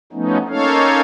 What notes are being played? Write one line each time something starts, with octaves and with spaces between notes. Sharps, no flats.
F3 A3 B3 C#4 D#4
A#3 C#4 D#4 A4 C#5 F5